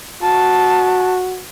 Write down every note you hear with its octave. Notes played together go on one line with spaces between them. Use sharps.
F#4 A5